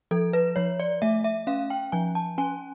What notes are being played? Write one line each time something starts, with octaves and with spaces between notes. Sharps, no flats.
F3 A4
B4
F3 C#5
D5
A3 E5
E5
C#4 F5
G5
F3 G#5
A5
C#4 G#5